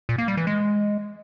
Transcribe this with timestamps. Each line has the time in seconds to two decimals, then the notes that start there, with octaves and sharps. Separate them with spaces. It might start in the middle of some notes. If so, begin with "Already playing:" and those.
0.09 A#2
0.18 A#3
0.28 G3
0.37 E3
0.47 G#3